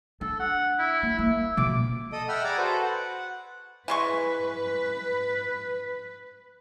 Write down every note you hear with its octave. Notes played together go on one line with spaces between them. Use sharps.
D4 A4
F#5
E4
A#3
A#3 E5
B2 F3 D6
A4 D#5 D#6
E5 F#5 G5 B5 E6 F6
G#4 D5 F#5 G#5 A#5 D6
F#4 A4 B4 C5
F#5
E3 G#3 B4 C#6